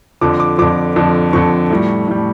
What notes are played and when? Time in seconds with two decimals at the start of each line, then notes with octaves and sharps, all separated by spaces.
0.21 F2 D3 F3 D6
0.40 D6
0.58 F2 D3 F3 D6
0.96 F2 D3 F3
1.33 F2 D3 F3 C#6
1.70 A2 G3
2.08 A2 G3